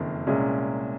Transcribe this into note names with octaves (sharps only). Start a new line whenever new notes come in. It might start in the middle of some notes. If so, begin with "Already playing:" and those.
Already playing: F#1 F2 D#3 A#3
C2 A#2 G#3 C#4